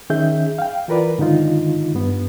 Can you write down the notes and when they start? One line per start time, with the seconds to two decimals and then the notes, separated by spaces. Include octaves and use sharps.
0.10 D#3 C#4 G#4 E5 G6
0.59 F5 G5
0.88 E3 F4 A#4 B4 D5
1.18 G#2 D3 D#3 D#4 F4
1.95 G2 B3